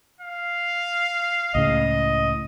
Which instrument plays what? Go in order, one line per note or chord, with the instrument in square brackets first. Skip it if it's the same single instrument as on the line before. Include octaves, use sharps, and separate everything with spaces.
[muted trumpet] F5
[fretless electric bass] C#2 A2 C#3 [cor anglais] D#5